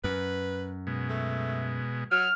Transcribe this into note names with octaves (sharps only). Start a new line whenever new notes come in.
F#2 B4
B2 G#3
A3
F#3 F6